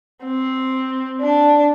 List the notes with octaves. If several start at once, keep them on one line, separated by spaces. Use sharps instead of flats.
C4
D4